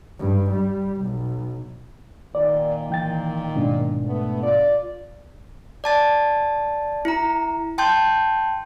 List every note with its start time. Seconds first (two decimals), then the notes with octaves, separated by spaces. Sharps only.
0.19 G2
0.51 G3
1.01 B1
2.35 A#2 D#3 D5
2.90 E3 G5 A6
3.55 G#2 B2 D4
4.05 A3 B3
4.43 F4 D5
5.84 D5 A5 A6
7.05 E4 A#5
7.78 G5 A5 C6 G6